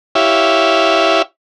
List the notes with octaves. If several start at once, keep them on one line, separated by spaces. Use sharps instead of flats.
E4 G4 C#5 E5 F5